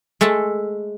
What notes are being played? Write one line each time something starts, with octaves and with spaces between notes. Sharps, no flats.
G#3 A3 A4 A5